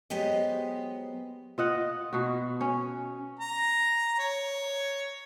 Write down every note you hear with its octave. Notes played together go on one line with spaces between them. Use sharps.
F#3 G#3 B3 G4 C5 D#5
F4 D#5 F#5
B2 F#4
C#4
A#5
C#5